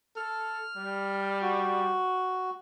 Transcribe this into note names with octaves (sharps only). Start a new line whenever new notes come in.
A4 F6
G3
F#4